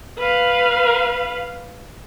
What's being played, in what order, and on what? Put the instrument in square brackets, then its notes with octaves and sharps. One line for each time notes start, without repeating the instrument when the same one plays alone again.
[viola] B4 F5